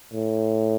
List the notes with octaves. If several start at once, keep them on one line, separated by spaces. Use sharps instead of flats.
A2